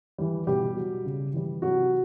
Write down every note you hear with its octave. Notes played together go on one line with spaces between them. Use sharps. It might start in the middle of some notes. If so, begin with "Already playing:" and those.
E3 G3
B2 G3 G4
F#3
C#3
E3 G3
C3 F#3 F#4